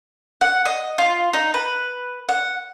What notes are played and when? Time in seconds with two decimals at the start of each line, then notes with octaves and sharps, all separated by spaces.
0.41 F#5
0.65 D#5
0.98 F4
1.33 D#4
1.54 B4
2.29 F#5